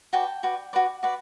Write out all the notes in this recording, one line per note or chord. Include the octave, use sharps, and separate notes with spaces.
F#4 B4 D5 G5 A5
F#4 B4 D5
F#4 B4 D5
F#4 B4 D5